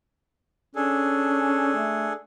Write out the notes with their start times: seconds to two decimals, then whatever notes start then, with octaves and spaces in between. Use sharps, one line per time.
0.76 C#4 D4 G#4 A4
1.76 A3